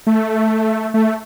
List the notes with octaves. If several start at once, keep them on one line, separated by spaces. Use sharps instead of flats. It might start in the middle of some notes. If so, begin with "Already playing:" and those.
A3
A3